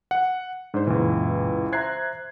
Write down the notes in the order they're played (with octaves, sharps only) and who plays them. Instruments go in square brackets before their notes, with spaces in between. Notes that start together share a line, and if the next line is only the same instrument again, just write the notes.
[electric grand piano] F#5
[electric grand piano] G#2 C5 [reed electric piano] D4
[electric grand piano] C#2 E3 [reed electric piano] F#2 A#2
[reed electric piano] C5 E5 A#5 [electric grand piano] F#6 G#6 C7